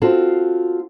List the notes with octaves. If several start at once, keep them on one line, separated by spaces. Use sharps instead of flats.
C4 F4 F#4 A4